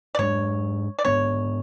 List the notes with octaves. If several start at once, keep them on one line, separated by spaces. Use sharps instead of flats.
D5
G#2 G#3 B3 D4 C#5
D5
G#2 G#3 B3 D4 C#5